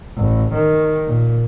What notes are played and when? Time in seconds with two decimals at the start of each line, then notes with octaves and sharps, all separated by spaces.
0.17 A1
0.54 D#3
1.07 A#2